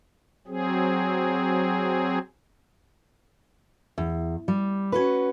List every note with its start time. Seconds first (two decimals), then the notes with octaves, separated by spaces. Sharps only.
0.47 F#3 C4 G#4
3.98 E2
4.48 G3
4.92 C#4 F#4 B4